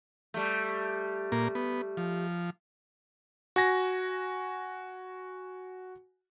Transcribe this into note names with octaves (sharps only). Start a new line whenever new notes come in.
G3 A3
A#2 A#3
B3
F3
F#4 G#5 A#6